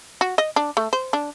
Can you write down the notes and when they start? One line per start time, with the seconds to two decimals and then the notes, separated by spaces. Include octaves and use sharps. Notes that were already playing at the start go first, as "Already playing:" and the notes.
0.21 F#4
0.38 D#5
0.56 D4
0.77 A3
0.93 C5
1.13 D4